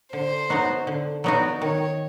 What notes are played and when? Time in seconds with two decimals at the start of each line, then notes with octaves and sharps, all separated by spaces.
0.13 D3 C5
0.50 F#3 B3 D#4 F#4
0.87 D3
1.24 F#3 B3 D#4 F#4 D5
1.61 D#3 C#5